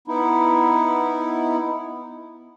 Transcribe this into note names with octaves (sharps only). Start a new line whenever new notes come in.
B3 D#4 E4